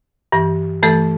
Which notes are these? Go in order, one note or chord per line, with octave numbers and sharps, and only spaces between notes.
G2 E3
G2 E3 A3 A4